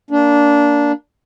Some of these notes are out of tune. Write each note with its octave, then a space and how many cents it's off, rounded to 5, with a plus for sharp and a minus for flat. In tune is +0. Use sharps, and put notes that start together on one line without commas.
A#3 +0 D4 -15